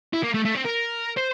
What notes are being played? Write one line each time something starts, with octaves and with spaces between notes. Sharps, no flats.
E4
A#3
A3
A3
C4
A#4
C5